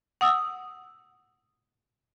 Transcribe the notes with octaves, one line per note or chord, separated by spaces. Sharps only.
F#5 D#6 E6